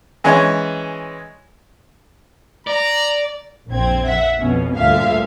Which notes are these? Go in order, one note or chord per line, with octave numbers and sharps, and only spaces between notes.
E3 G#3 C#4 G#4 C#5 D#5
D5 A#5
A#1 F2 C4 G#6
E5 F#5
F2 B2 C#4
D2 G2 A#2 D3 E5 F5